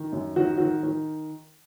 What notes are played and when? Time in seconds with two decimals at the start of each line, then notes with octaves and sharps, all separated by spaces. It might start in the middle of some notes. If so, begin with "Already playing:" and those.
Already playing: D#3
0.13 F#2
0.36 D#3 F#4
0.57 D#3 F#4
0.83 D#3